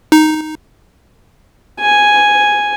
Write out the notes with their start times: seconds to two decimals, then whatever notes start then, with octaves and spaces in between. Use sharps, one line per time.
0.12 D#4
1.80 G#5